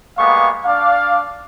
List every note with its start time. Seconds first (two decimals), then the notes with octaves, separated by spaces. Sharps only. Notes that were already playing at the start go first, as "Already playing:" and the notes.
0.18 G3 G#3 A#3 B3 F5 C#6
0.65 D4 D5 F5